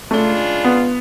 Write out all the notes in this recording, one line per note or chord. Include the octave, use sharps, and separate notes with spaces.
C#3 G#3 A3 D4 F4
B3